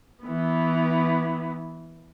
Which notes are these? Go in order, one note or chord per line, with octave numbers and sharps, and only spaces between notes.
E3 B3